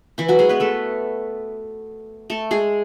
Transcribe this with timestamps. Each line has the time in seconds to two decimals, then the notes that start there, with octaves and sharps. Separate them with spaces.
0.18 E3 E4
0.28 F#3 F#4
0.39 G#3 G#4
0.49 B3 B4
0.60 A3 A4
2.30 A3 A4
2.51 G#3 G#4